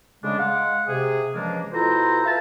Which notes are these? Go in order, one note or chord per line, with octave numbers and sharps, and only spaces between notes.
C#3 G#3 D4
G#3 F5 F#5
C3 G#4
C#3 E3 F3 G#3 A#3 D4
B2 E4 F4 A4 C5 A#5
B4 E5 F5 A5